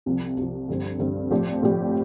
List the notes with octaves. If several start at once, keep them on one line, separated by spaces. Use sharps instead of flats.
C2 C3 F3
C2 C3 F3
G2 D3 G3 C4
G2 D3 G3 C4
A2 F3 C4 G4 D5
A2 F3 C4 G4 D5